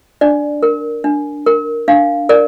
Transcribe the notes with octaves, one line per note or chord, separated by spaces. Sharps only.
D4 D5
A#4
D4
A#4
D4 F5
A#4 D5